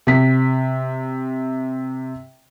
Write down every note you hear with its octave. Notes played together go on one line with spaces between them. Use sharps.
C3 B6